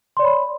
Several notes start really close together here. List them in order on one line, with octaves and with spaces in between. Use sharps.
C6 D5 C#5 B5